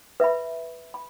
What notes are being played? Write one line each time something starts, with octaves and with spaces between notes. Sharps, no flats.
B4 E5 B5
B5